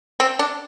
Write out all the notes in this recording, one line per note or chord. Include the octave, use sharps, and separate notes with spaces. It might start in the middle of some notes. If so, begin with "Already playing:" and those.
C4
D4